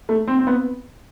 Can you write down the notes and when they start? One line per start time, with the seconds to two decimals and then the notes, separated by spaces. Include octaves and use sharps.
0.09 A3
0.28 C4
0.39 C4
0.47 B3